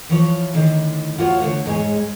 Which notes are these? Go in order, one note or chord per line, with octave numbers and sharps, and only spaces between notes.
E3 F3 C#5
A2 D3 D#3
A2 F4 F#4 C#5
D3 A3 C#5
G#2 G#3 C#5 G#5